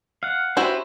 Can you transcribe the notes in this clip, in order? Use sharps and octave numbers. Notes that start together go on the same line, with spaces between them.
F5 F#5
C#4 E4 F#4 G4 B4 C5